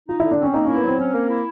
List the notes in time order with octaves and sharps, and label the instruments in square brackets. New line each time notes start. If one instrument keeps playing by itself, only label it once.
[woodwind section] D#4 [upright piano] F4
[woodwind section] D3 [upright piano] E4
[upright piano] D4
[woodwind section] C4 [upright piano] C#4
[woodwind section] A#3 [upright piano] D#4
[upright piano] C#4 [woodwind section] E4
[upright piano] B3
[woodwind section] F#3 [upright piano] C4
[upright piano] C4 [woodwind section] C#4
[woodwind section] A#3
E4